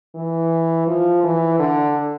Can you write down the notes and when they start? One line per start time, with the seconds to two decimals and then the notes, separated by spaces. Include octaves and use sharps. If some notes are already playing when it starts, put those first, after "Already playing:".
0.16 E3
0.87 F3
1.24 E3
1.59 D3